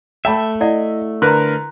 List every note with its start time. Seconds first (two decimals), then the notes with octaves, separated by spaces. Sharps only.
0.25 A3 E5 G5 A5 B5
0.61 E4 D5 D#5 F#5
1.22 D3 A#4 B4 A#5 C6 F#6